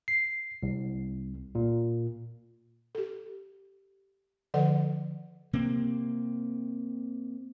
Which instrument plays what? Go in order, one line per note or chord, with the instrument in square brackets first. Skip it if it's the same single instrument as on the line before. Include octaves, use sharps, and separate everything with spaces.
[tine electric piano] C7
C2
A#2
[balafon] G4 A4
D3 F3 A4 D5 F#5
[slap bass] C3 A#3 C4